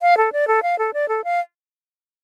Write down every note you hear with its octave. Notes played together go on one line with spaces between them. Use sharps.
F5
A4
D5
A4
F5
A4
D5
A4
F5